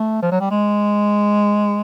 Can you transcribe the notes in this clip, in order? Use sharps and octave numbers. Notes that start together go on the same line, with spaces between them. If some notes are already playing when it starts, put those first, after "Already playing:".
Already playing: A3
F3
F#3
G3
G#3